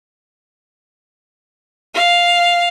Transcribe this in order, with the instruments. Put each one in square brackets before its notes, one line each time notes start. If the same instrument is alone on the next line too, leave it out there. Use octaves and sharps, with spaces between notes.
[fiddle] F5